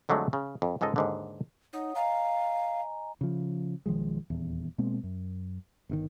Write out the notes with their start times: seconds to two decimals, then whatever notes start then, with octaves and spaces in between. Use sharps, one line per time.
0.09 F2 D3 F#3 G#3 A3
0.33 C#3
0.62 F2
0.81 C#2 G#2 G#3 A4 D#5
0.96 D#2 G#2 D3
1.73 D#4 C#5 F#5 D#6
1.95 D#5 F5 G#5 A#5
3.21 C#3 F3
3.86 B1 D#3 F3 G#3
4.30 D#1 E2
4.78 B2 G#3 A#3 C4
5.03 F#2
5.89 G1 C3 D#3